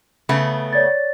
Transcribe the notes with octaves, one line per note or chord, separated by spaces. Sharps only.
C#3 A3 B3 B5
C#5 D5 A6